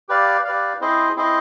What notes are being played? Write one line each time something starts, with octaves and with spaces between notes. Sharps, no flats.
G4 B4 D5 F5
G4 B4 D5 F5
C4 E4 G#4 C5 D#5
C4 E4 G#4 C5 D#5